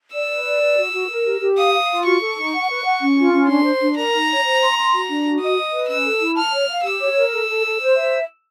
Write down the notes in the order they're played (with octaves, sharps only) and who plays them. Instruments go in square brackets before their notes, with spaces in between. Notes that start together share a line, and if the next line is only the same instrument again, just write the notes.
[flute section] D5 [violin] E6
[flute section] B4
D5
B4
F#4
F#4
A#4
G4
G4
[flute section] F5 [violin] D#6
[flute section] F5
F4
[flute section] F#4 [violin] C#6
[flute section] A4
D#4
F#5
B4
F#5
C#4
F4
C#4
[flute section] D4 [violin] C6
[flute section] C5
D4
[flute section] A#4 [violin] A#5
[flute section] D#4
C#5
C5
C6
C6
F#4
D4
F#4
[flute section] D#5 [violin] D#6
[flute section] D#5
B4
[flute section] C#4 [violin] E6
[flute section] A4
E4
[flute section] A5 [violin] F6
[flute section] C#5
F5
[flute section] G4 [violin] E6
[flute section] C#5
A#4
A4
A4
A4
C5
E5